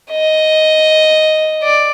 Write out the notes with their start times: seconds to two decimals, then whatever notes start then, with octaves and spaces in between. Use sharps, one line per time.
0.11 D#5
1.63 D5